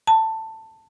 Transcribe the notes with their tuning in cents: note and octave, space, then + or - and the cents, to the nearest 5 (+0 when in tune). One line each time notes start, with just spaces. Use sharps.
A5 +15